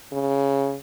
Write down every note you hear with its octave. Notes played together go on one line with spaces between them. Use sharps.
C#3